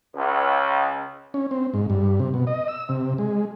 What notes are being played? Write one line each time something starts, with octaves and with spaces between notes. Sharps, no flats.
C#2
C#4
C4
G#2
G2
C3
B2
D#5
E6
C3
G#3